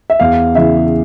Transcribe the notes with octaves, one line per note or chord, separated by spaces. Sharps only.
E5
E2 F5
C#3 E3 E5